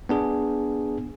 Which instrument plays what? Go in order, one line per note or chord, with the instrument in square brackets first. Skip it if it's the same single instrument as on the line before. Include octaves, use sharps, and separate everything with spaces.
[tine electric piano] B3 D4 G#4